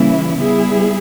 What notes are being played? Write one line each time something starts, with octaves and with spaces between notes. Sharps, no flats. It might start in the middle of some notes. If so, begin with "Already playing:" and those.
Already playing: C#3 E3 G3 A#3 E4
G3 B3 E4 G#4